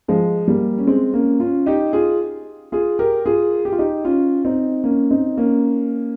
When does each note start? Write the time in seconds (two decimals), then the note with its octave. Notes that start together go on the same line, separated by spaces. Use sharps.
0.08 F3 G#3
0.48 G3 A#3
0.78 C#4
0.87 G#3 C4
1.13 A#3 C#4
1.40 C#4 F4
1.66 D#4 G4
1.93 F4 G#4
2.72 F4 G#4
2.99 G4 A#4
3.26 F4 G#4
3.65 G4
3.72 F4
3.79 D#4 G4
4.05 C#4 F4
4.45 C4 D#4
4.84 A#3 C#4
5.11 C4 D#4
5.37 A#3 C#4